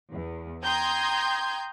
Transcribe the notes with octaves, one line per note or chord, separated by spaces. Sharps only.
E2
G5 A#5 C6 D#6 G6 G#6